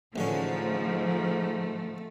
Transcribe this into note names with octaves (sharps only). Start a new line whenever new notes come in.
A1 G#2 D3 F3 A3 C#4